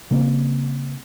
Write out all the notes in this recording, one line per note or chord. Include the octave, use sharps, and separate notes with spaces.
C#3 G3 A#3 C4